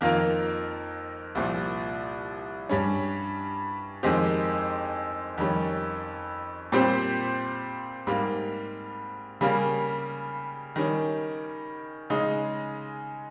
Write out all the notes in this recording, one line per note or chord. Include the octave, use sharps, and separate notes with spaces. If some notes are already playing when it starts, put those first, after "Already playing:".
F2 D#3 A#3 F4 A#4
C2 A#2 F3
G2 G3 C#4
F2 D#3 G#3 C4 G4
F2 D#3 G3 C#4
A#2 G3 C4 G4 C5
G#2 G3 A#3
C#3 G3 A#3
D#3 G3 C#4
C#3 G#3 D#4